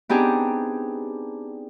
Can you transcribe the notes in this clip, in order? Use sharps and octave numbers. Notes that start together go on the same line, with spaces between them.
B3 C4 D4 D#4 G4 G#4